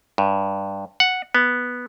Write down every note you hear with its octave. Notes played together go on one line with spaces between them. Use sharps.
G2
F#5
B3